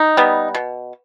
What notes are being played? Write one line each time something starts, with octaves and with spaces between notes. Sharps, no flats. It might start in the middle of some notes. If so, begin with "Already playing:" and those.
Already playing: D#4
G3 B3
B2